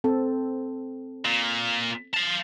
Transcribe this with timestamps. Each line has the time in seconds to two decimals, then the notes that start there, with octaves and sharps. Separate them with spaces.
0.04 C4 A4
1.25 A#2
2.13 F5 A5